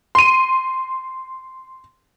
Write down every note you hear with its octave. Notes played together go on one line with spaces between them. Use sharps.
C6 D#7